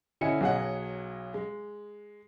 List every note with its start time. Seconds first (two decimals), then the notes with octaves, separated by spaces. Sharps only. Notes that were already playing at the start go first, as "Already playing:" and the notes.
0.21 D3 C#4 E4 D#5 G#5 C#7
0.40 B1 F#3 G#4 D#5 F#5
1.34 G#3